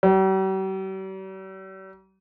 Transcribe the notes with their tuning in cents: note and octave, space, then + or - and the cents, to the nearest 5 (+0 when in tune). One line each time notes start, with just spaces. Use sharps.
G3 -45